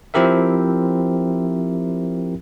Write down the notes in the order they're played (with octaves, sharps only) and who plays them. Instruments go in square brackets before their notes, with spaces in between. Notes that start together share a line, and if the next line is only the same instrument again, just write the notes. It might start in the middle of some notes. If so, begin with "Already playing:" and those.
[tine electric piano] F3 C4 E4 G4 A#4 E5